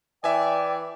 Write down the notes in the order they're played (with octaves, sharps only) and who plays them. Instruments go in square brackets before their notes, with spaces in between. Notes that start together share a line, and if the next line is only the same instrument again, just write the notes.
[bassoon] E3 [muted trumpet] D5 [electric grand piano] E5 G#5 [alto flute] G5